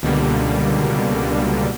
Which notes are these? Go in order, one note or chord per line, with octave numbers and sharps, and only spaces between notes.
C#2 B2 D3 G3 A#3